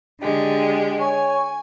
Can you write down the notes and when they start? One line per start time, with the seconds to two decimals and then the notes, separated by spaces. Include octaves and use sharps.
0.21 D3 G#3 G4
1.00 C#5 G#5